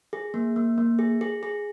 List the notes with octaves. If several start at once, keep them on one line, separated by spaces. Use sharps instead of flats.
G#4
A#3
A#3
A#3
G#4
G#4
G#4